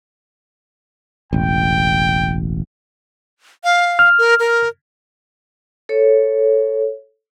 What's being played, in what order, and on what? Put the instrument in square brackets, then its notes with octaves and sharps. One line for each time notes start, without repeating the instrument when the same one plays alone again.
[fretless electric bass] E1 A1 [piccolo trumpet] G5
[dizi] F5
[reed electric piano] F6
[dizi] A#4
A#4
[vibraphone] A4 C#5